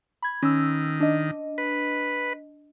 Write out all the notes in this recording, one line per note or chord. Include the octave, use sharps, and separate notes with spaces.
B5 G#6
D#3 C#4 E6
D4 D#5
B4